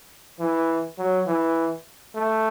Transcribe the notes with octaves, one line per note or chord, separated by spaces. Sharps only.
E3
F#3
E3
A3